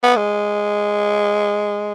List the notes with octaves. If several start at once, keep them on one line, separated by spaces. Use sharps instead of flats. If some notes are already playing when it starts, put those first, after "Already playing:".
B3
G#3